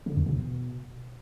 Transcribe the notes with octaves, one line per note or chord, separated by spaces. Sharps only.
D3
E2
B2